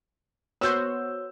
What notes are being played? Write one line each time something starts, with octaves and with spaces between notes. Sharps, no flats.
B3 F#4 C5 C#5 E6 G6